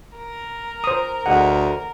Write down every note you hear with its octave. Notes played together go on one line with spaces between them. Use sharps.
A#4
C5 D#6
D2 G#4 D#5 F#5